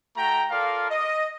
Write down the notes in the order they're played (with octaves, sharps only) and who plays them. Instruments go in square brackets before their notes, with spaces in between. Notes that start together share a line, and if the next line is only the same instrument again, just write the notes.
[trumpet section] A3 F#4 G5 A#5
F4 A4 A#4 D5 F5
D#5